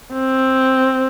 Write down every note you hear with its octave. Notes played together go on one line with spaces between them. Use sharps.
C4